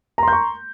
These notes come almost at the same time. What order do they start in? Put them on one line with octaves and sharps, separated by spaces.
A#5 C6 G6 C#6